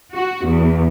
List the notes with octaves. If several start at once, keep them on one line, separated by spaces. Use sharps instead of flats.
F#4
E2